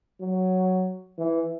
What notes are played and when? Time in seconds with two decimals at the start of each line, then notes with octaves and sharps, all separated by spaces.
0.20 F#3
1.18 E3